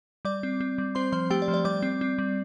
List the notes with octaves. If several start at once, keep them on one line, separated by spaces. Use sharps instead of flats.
G3 D5 D6
C4
C4
G3
C4 C5 C6
F3 C5 C6
A3 G4 G5
D5
F3
D5
G3 D5 D6
C4
C4
G3